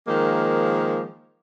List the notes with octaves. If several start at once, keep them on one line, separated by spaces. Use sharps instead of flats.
D#3 F3 G#3 A#3